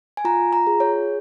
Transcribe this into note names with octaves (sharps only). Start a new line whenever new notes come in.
G#5
F4 A#5
A#5
G#4
C#5